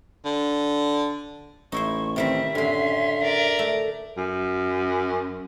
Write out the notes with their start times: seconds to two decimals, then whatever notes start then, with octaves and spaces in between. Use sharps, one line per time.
0.25 D3
1.72 A1 D#4 E4 C5 C#6
2.16 C3 D#3 G3 C4 E5
2.55 F#2 A2 D3 C#4 C6
3.23 A#4 D5
3.59 A3
4.17 F#2